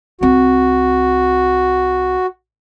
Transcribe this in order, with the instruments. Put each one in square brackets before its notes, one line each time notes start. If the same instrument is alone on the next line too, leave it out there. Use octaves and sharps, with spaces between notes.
[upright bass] C2 C4 [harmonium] F#4